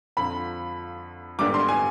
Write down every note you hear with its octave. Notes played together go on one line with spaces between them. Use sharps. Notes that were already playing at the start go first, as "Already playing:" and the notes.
F2 D3 F3 B5
G#1 G2 D3 G3 B3 D6
C6
G#5